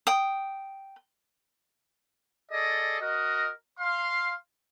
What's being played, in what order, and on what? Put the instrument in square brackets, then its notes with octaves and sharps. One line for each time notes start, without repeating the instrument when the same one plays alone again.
[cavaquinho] G5 D#6
[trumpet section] G#4 A4 D5 D#5
F#4 A#4 D#5
F5 C6